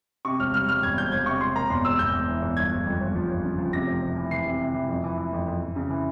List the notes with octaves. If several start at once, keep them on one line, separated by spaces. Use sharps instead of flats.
C3 C#6
E1 F6
G3 F6
G3 F6
E2 G#6
E1 G6
E1 G#6
C3 C#6
E1 C6
A#3 A#5
E2 C6
E1 E6
E2 G6
E2
E3
E2
G1 G#6
G1
F2
G1
F3
G1
C#3
F3
C3 A#6
F1
F1
E3
E3 C7
C3
C3
E3
F2
E3
E3
F2
F2
F2
C#3
E3